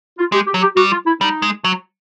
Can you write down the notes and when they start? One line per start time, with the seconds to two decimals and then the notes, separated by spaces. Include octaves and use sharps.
0.18 F4
0.32 G#3 G4
0.46 G4
0.54 F#3
0.62 G4
0.76 G3 F#4
0.91 F4
1.06 E4
1.21 G3 D#4
1.42 G#3
1.64 F#3